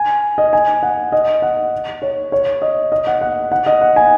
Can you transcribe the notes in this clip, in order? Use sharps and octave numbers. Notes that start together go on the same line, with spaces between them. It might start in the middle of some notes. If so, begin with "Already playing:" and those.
Already playing: G#5
D#5
G#5
F#5
D#5
F#5
C#5
C#5
D#5
D#5
F#5
F#5
F#5
D#5
F#5
G#5